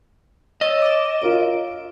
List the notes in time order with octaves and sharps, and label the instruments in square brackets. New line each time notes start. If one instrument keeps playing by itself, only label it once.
[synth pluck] C#5 E6 A6 [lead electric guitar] D#5
[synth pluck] D6 E7
[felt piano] F4 A#4 C#5 [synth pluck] D7